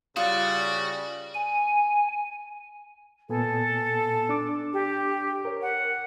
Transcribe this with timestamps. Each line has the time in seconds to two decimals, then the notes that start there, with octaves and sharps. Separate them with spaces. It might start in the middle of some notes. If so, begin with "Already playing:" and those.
0.16 C#3 G3 F4 F#4 D#6 A6
1.35 G#5
3.29 A#2 B3 A4 G#5
4.29 D4 D6
4.73 G4
5.45 A#4 C#5
5.62 F#5